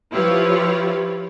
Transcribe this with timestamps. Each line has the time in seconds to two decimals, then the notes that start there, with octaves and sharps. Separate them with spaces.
0.12 F3 E4 F4 G4 B4 C#5